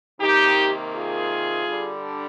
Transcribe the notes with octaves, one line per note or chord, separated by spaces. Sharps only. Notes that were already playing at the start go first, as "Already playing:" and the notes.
C3 D#3 A#3 D#4 G4
F4 G#4
D3 G3 D4